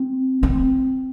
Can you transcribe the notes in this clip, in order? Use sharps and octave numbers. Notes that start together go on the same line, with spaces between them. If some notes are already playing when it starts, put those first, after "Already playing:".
Already playing: C4
C4